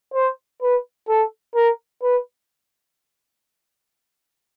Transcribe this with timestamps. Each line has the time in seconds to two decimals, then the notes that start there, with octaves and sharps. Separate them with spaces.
0.14 C5
0.62 B4
1.09 A4
1.55 A#4
2.03 B4